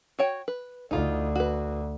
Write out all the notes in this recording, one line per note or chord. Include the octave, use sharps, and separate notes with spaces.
F#4 C#5 G5
B4
D2 D#4 F4
F#4 B4